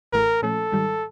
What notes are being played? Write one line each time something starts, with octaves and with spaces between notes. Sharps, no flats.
A1 A2 E3 A3 A#4
A#2 F3 A3 C#4 A4
G#2 D#3 G3